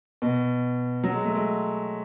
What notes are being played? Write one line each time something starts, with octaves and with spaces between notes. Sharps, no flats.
B2
F#3
G#3
A3
G#3